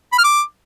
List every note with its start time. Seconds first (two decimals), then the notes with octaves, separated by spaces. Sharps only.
0.13 B5
0.18 F6
0.24 D6